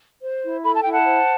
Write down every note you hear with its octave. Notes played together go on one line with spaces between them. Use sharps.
C5
E4
A4 B5
A5
E4 G5
F#5 A5
C5